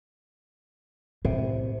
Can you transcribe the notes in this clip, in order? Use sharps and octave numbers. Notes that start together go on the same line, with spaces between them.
A2 C3